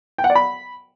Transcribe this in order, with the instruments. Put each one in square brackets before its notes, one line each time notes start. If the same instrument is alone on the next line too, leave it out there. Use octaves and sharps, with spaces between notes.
[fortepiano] G5
F#5
D5
B5